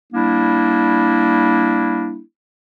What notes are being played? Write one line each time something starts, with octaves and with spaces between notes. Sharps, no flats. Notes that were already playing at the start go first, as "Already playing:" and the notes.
G3 A#3 D4 E4